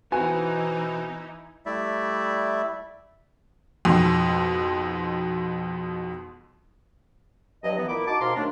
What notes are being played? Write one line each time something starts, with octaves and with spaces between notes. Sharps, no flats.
B2 E3 C4 D#4 F#4 B4 G#5
G3 A3 E4 D5 E5
F2 G#2 B2
E2 G2 F#3 D#5
E3 B3
A#2 E4 D6
D#4 F#4 A5 D6
D#2 G#2 B2 F5 A#5 C6
D#3 F#3 A3 A#3 D4